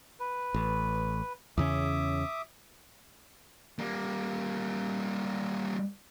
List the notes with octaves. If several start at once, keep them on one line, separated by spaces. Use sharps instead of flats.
B4
A1
E2 C#3 C#4 E5 D6 D#6
G3 A#3